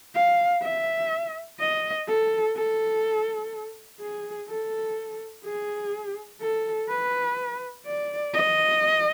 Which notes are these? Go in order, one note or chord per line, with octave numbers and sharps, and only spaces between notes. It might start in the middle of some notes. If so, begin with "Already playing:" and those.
F5
E5
D#5
A4
A4
G#4
A4
G#4
A4
B4
D5
D#5